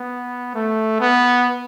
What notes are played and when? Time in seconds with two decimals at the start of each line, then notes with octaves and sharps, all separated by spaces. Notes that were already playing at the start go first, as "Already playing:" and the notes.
Already playing: B3
0.55 A3
1.00 B3